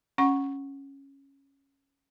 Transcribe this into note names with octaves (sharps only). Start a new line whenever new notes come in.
C#4 F#5 C#6